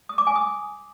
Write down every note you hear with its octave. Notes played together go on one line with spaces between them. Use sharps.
D#6
D6
G#5
D#6